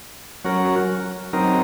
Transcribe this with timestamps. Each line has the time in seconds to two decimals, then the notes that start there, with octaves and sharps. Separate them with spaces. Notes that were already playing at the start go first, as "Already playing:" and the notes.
0.44 F#3 C#4 F#4 A#4
1.33 F#3 C4 D#4 A#4